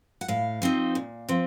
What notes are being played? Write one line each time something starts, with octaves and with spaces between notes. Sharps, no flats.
F#5
A2 F5
F3 C4 D#4
A#2
F3 C4